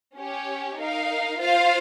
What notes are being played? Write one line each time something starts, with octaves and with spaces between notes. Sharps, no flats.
C#4 G4 C#5
D#4 A#4 F5
F4 C5 F5